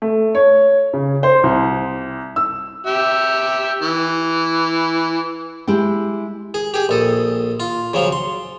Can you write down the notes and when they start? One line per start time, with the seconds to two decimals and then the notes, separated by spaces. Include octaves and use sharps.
0.02 A3
0.35 C#5
0.93 C#3
1.23 C5
1.43 C2
2.36 E6
2.86 G4 E5
3.82 E3
5.68 G#3 E4 G4 G5
6.54 G#4
6.74 G4 G#4
6.89 A#1 A4 D#6
7.60 F4
7.94 C#3 F3 F#3
8.12 C6